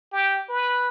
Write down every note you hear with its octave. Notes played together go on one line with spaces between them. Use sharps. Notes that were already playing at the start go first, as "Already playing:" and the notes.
G4
B4